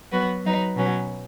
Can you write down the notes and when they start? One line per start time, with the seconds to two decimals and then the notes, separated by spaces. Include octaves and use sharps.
0.11 F#3 B3 F#4 B4
0.45 F#3 D#4 B4
0.76 B2 F#3 C#4 B4